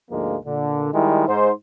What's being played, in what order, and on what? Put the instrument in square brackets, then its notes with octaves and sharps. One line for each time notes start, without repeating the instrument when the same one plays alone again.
[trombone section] D2 G#2 F3 G#3 A#3
A#2 D3
D#3 G3 G#3 E4
G#2 C5